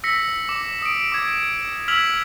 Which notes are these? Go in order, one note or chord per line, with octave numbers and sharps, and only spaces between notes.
E6 A#6 B6 C#7
D6
D#6 D7
D6 G#6
E6 F6 G#6 B6 F7 F#7